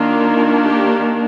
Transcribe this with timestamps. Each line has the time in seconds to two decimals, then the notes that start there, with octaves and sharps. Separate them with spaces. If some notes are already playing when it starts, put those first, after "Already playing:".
Already playing: D#3 A#3 D4 F4
0.64 G4